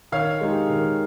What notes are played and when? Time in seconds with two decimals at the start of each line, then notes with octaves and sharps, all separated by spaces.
0.12 D#3 C#5 F5
0.41 G#3 D#4 G4
0.70 D#3